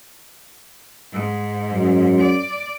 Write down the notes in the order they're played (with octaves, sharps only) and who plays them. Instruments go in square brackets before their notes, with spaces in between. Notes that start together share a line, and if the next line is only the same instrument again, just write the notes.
[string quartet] G#2
[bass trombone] F#2
[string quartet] D5